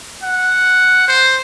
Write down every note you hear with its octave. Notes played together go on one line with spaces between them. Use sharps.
F#5
C5